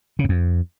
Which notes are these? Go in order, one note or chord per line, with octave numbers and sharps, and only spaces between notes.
C#3
F#2
F2